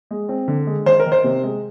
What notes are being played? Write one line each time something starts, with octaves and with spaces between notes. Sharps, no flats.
G#3
C4
D3
G#3
D#3 C5
A#4
D#3
C5
C3
G#3